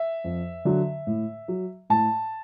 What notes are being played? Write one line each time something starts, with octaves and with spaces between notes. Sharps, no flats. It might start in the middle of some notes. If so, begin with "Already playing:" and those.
Already playing: E5
F2
D3 F#3
A2
F#3
A2 A5